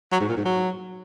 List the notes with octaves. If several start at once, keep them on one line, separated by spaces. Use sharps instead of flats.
F#3
G#2
A#2
G#2
F#3